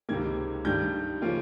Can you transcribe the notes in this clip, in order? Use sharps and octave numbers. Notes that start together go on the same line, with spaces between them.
C#2 C3 D#3 A#3 G#6
G2 D#3 G3 G6
C#3 F3 A#3 F4